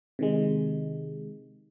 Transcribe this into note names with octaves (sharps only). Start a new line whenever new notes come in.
C3 D#3 G#3